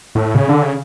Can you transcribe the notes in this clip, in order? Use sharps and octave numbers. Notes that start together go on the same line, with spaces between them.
A2
C#3
D3
C#3